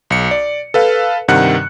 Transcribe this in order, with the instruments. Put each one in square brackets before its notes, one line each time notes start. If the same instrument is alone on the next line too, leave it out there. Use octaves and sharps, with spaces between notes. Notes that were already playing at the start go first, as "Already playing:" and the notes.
[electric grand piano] B1 C#7
D5
A4 B4 F5
G2 C3 D#3 F#5 F#6 C#7